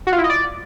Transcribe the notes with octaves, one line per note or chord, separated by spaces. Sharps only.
F#4
F4
E4
D#5
D5